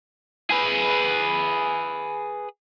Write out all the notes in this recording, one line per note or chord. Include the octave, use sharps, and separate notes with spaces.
G#4 B4